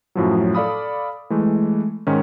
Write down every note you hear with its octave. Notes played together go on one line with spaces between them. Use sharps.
F#2 A2 F3 F#3
A4 D5 F5 B5 D#6
E3 G#3 A3
G#2 D#3 C#4